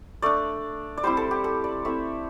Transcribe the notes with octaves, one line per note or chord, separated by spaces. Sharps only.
A3 D4 D5
D5
G3 C4 E4 C5
A4
G4
A4
D5
A3 C4 E4 E5